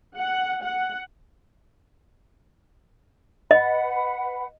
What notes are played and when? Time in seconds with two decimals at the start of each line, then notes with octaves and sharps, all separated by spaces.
0.17 F#5
0.62 F#5
3.51 B4 D#5 F#5 B5